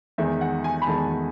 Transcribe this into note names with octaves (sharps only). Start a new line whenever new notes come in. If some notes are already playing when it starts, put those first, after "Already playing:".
E2 D#3 G#3 E5
F#5
G#5
B5
E2 D#3 G#3 A5